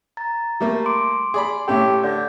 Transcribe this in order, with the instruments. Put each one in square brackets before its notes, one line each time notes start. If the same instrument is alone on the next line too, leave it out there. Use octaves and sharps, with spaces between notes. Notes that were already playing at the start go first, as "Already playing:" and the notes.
[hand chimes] A#5 A6
[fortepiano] G3 A3 A#3
[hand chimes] C6 D6 D7
[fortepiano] G#4 D5 B5
[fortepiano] A2 C#4 A4 [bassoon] G4
[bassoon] D3 [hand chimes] G6